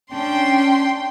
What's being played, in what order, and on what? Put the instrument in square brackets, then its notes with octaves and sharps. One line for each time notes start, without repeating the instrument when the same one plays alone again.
[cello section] C#4 D4 [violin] G5 C6